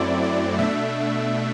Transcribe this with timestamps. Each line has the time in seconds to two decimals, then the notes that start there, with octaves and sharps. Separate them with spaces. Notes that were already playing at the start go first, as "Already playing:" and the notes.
Already playing: F#2 F#3 A3 C4 E4 D5
0.22 D5
0.58 B2 A3 D4 E5